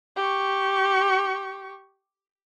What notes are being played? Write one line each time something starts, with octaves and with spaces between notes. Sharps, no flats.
G4 C#6